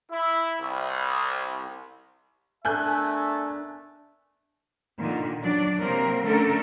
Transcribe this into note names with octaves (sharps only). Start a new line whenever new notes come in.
E4
C2
A3 B3 D4 A#4 E5 G#5 F#6 G6
A#2 D3 D#3
F#3 D4 D5
C3 F#3 A#3 C4 A#4
D3 A3 C#4 A4 A#4